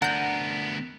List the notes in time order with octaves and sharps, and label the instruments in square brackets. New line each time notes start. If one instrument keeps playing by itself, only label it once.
[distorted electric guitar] D2 B3 [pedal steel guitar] D4 A#4 [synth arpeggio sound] F#5 G6